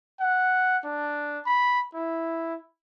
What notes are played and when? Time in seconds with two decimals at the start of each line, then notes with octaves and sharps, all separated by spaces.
0.20 F#5
0.84 D4
1.46 B5
1.94 E4